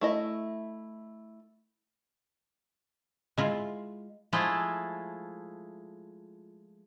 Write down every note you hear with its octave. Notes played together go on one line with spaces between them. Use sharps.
A3 E4 D#5
G#3 E4 F4
F3 G#3 A3 E4 F4